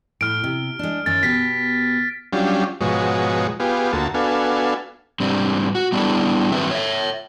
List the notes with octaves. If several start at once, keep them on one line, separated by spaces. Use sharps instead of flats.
A2 F6 D7
C3
G#3 D4
F#2 D#3 C#4 A6
B2 G4 B6
F#3 G3 C#4 D4 F4 G4
G#2 B2 F3 G#3 F#4 C#5
B3 F4 G4 G#4
D2 A#3 F#4 A5
B3 D4 F#4 A4 F5 G#5
G#2 G3 C4 D4
F#4
G3 B3 D4 E4 G#4
G2 D#3 F#3 C4 B4 E5
C#5 E5